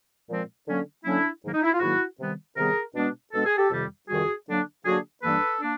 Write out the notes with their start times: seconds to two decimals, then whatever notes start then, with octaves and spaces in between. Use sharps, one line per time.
0.28 A#2 F3 G#3 C4
0.66 D3 F#3 A#3 C#4
1.05 D3 F#3 A#3 C#4 D4 E4
1.42 G#2 D#3 F#3 A#3
1.54 D#4
1.63 E4
1.72 F4
1.80 G#2 D#3 F#3 A#3 E4 F#4
2.18 C3 D#3 G3 B3
2.56 C3 D#3 G3 B3 G#4 A#4
2.95 B2 G#3 B3 D4
3.33 B2 G#3 B3 D4 A4
3.46 G#4
3.58 G4 A4
3.70 F2 C3 D#3 G3
4.08 F2 C3 D#3 G3 F#4 G#4
4.47 D3 F#3 A#3 D4
4.85 D3 F#3 A#3 D4 F#4 G#4
5.22 G2 E3 G3 A#3 D4 A4 B4
5.61 A#3 D4